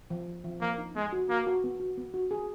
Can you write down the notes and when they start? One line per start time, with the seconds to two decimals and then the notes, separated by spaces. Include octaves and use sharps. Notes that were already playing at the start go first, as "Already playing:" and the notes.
0.10 F3
0.27 F3
0.44 F3
0.61 F3 A#3
0.78 D#4
0.95 G#3 B3
1.13 F#4
1.29 A#3 F#4
1.47 F#4
1.64 B3
1.80 F#4
1.97 B3
2.14 F#4
2.31 G#4